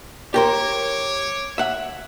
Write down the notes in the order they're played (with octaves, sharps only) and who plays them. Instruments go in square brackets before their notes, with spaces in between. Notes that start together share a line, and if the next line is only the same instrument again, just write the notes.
[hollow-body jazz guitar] G4 A#4 C5 [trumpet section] C#5 D6
[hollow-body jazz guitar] E5 F#5